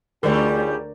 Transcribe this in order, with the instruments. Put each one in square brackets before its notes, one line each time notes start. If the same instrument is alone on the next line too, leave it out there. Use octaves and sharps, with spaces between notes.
[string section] D2 [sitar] D3 G3 C#5 [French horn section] F4 G#4 [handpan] A#4 D5